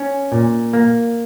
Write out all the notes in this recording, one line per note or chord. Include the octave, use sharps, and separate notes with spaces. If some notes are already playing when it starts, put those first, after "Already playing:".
Already playing: C#4
A#2
A#3